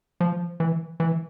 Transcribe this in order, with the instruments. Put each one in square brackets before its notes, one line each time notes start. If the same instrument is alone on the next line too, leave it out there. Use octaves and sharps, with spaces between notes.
[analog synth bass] F3
E3
E3